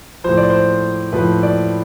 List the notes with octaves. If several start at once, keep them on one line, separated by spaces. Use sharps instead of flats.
A2 F3 C5
D5
C5
A2 F3 B4
D5